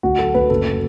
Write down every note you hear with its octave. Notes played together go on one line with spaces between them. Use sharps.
D2 F#4
F#3 A4
D2 B4
F#1 A4
F#3